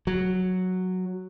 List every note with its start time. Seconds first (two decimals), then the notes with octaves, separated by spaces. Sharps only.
0.07 F#3